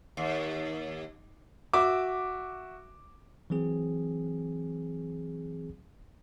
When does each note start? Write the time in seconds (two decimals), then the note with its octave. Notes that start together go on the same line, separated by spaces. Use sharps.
0.17 D#2
1.73 F#4 E5 D6
3.50 E3 F#3 C4 G#4